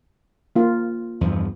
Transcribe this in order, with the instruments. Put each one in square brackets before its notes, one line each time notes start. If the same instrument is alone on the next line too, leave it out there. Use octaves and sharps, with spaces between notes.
[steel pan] A#3 F4
[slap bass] E2 G2 F3